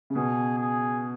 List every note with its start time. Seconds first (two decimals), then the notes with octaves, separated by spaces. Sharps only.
0.10 C#3
0.15 B2 G#4
0.59 G#4